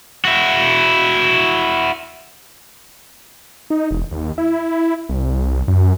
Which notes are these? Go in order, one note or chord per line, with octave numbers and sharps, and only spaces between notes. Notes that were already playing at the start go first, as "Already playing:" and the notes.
E4 F#4
D#4
E1
D#2
E4
C2
F#2